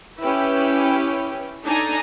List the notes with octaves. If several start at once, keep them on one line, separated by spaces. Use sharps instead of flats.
C#4 E4 G4 B4
D4 D#4 A4 G#5 A#5